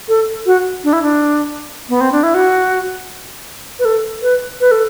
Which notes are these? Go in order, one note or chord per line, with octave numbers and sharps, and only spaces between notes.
A4
F#4
D4
E4
D4
B3
C4
D4
E4
F#4
B4
A4
B4
B4
A4